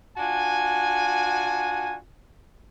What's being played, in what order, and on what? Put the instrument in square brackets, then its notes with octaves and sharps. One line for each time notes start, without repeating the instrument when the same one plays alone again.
[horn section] D4 F4 F#4 G#5